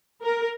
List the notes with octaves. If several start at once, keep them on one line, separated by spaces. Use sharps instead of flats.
A#4